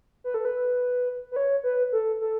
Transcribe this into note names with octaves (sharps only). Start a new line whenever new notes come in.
B4
A4
B4
B4
C#5
B4
A4
A4